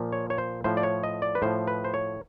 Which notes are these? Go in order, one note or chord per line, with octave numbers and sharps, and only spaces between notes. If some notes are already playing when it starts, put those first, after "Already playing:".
Already playing: A#2 F3
C#5
C#5
C5
A2 F3 C5
D5
C#5
D#5
D5
B4
A2 F3 C5
B4
C5
C#5